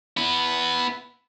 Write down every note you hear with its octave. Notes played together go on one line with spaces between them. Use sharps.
B3 E4